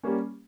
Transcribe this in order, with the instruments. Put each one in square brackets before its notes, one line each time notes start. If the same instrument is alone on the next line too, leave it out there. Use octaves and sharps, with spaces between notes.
[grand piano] G3 A#3 C#4